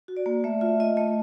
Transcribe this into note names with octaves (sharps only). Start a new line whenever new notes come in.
F#4
D5
A#3
A3 E5
F4 E5
F4 D#5
A3 D#5